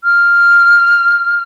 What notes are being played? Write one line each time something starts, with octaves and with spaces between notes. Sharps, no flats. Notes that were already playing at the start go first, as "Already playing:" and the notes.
F6